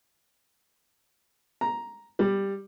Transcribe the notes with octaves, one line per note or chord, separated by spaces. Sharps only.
A#5
G3